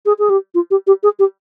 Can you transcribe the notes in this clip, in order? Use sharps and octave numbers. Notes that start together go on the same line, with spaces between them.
G#4
G#4
G4
F4
G4
G4
G#4
G4